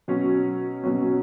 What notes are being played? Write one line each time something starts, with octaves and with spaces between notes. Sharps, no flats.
B2 F#3 C#4
B2 F#3 C#4